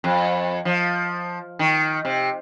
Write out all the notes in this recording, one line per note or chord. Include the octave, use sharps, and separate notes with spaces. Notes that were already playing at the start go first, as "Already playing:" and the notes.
F2
F3
D#3
C3